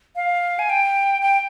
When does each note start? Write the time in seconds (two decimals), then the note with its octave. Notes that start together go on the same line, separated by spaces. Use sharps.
0.16 F5
0.59 G#5
0.70 G5
1.22 G5